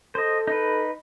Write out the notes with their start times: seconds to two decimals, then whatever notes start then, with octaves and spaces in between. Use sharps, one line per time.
0.15 A4 C5 D#5
0.47 D#4 B4